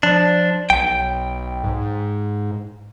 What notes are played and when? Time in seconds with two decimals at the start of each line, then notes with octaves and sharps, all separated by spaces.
0.03 F3 D4
0.70 B1 G5
1.64 G#2